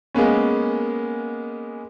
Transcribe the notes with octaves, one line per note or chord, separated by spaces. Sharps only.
G#3 A#3 B3 C#4